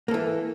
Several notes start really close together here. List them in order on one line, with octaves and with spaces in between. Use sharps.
A#3 A4 E3